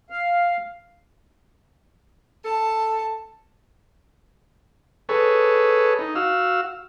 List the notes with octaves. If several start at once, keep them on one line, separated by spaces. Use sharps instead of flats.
F5
A4 A5
G#4 A4 B4 C#5
D#4
F#4 F5 E6